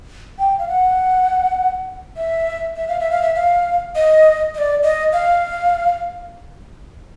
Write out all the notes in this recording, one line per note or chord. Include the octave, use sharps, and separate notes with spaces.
G5
F5
F#5
E5
E5
F5
E5
F5
E5
F5
D#5
D#5
D5
D#5
F5